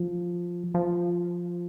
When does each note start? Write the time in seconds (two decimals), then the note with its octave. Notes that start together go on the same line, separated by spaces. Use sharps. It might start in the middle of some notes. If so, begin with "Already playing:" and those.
Already playing: F3
0.74 F3